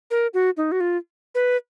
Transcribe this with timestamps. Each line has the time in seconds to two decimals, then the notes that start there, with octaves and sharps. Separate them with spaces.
0.11 A#4
0.34 F#4
0.57 D#4
0.72 F#4
0.80 F4
1.35 B4